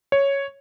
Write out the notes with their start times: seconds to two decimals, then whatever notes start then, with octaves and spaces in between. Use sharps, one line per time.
0.12 C#5